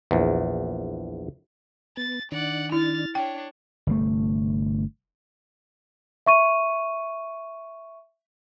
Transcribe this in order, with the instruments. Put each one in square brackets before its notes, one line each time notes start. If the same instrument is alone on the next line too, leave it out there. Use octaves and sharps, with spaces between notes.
[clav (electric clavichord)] A#1 E2
[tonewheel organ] B3 [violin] A6
[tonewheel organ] D#3 D4 [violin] D5 F#5
[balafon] E4 [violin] F6 A6
[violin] D4 C#5 [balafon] G5
[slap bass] G1 C3 A3
[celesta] E5 C#6 D#7